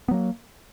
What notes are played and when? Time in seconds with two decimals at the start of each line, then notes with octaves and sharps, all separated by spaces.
0.08 B3
0.11 F#3
0.14 A#3